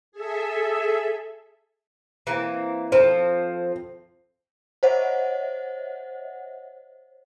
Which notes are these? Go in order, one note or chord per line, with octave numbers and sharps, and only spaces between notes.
G#4 A4 E5
E3 A#3 C4
F3 C4 A4 C5
C5 C#5 D#5 E5 F#5